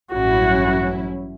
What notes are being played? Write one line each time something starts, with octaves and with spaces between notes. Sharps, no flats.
A1 G2 F#3 C#4 E4 F#4